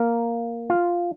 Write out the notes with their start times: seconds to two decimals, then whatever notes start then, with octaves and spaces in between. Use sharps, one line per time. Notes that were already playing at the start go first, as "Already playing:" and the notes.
Already playing: A#3 A#4
0.70 F4